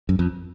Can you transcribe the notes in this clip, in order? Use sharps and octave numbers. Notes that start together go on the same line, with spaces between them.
F#2
F2